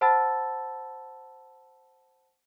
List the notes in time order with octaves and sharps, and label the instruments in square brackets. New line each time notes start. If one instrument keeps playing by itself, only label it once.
[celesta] C5 F#5 A5 B5 E6 A6